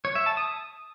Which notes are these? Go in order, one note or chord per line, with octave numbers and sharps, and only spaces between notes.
C#5
E5
A5
D#6